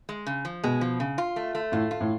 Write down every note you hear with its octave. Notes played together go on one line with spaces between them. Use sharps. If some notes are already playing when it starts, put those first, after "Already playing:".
G#3
C#3
F3
B2 G#3
F3
C#3
F4
A3
A3
A2 F4
F4
A2